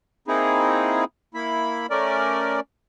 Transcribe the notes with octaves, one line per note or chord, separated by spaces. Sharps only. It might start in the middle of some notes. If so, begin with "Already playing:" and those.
A#3 C4 D#4 E4 G#4
A#3 E4 B5
A3 C#4 A#4 D5